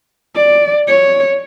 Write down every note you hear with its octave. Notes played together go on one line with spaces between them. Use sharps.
D5
C#5